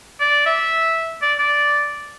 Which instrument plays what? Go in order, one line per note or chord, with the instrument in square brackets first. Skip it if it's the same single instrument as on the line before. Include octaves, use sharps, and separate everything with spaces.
[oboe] D5
E5
D5
D5